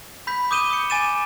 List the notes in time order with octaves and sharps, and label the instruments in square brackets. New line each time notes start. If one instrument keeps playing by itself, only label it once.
[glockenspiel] B5 G6 B6
D6 D#6 G6 D#7 E7 G7
D#6 C#7
G#5 D6 A6 D#7 E7